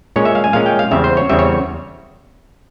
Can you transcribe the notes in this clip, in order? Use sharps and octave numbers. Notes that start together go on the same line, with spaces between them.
A#2 G#3 C#4 C#5
E5
F5
G#5
A#2 G#3 C#4 F5
G5
F5
E2 C#3 G3 C4 E5
C5
C#5
E2 C#3 G3 C4 E5
C#5